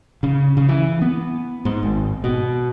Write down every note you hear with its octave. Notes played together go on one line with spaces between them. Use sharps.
C#3
C#3
E3
B3
G#2
G#1
B2